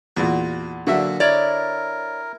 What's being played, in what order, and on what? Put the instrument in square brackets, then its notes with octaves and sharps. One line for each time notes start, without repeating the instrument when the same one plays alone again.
[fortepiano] E2 A#2 [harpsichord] F#4
[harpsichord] A#2 F#3 [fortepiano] D3 F#4 E5
[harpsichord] E4 [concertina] A#4 [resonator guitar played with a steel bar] C#5 D5